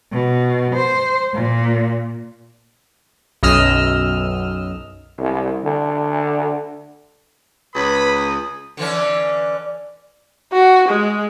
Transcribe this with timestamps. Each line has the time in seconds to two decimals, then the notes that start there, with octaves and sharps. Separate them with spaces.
0.13 B2
0.75 C5
1.34 A#2
3.43 B1 F#2 D#5 E6 F6
5.18 C2
5.64 D3
7.75 C#2 B4 B5 D#6
8.77 D3 E3 C#4
10.52 F#4
10.88 G#3